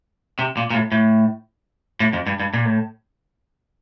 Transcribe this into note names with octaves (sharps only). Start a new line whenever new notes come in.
C3
A#2
A#2
A2
A2
A2
F2
G2
G2
A#2
A2